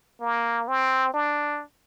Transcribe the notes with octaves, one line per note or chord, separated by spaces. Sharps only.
A#3
C4
D4